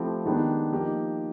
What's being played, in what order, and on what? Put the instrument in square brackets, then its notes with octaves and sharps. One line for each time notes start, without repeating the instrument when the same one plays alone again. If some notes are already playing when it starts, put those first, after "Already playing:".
Already playing: [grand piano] F3 A3 C4 E4 G4
D#3 G#3 B3 D4 G4
F3 A#3 D#4 G4